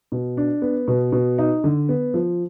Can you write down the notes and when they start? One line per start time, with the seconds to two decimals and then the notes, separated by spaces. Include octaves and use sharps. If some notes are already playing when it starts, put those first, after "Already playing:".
0.12 B2
0.37 D4
0.62 B3
0.88 B2
1.12 B2
1.38 D#4
1.64 D3
1.89 B3
2.14 F3